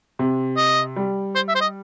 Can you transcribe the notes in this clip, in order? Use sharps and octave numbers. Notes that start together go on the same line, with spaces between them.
C3
D#5
G3
C5
E5
C5
D#5